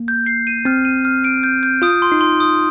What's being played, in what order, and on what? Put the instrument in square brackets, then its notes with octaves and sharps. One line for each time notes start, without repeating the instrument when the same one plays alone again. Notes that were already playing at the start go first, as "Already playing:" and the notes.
Already playing: [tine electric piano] A#3
[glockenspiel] G6
C7
D#7
[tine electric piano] C4 [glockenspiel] F6
[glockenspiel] D#7
F6
D7
G6
G6
[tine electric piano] F4 [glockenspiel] D#6
[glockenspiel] C6
[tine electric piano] D#4
[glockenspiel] C6
D#6